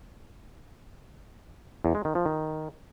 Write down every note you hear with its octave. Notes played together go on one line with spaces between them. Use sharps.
E2
G#3
D#3
F3
D#3